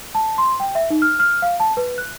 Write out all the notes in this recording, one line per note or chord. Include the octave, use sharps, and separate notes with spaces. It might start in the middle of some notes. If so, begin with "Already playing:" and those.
A5
C6
G5
E5
D#4
F6
F6
F5
A5
B4
F#6